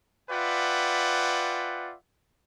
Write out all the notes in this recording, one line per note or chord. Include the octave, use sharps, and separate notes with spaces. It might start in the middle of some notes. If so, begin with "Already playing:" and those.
F4 B4 D5 E5 F#5 G5